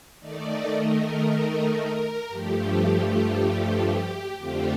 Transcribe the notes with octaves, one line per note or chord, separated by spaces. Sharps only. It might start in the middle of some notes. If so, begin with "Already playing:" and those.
D#3 A3 D#4 D5
A#4
A#4
G2 F3 A3 G4
F2 D3 A3 C4 F4 G4